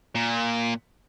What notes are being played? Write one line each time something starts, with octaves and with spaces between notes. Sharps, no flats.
A#2